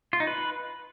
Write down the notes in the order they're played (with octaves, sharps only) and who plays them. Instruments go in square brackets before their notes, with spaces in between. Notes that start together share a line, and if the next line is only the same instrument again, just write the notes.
[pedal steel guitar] F4
D#4
B4